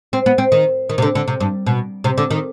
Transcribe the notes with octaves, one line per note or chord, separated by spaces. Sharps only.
C4
B3
C4
D#3
D#3
C3
D3
D3
C3
G2
B2
C3
D3
D#3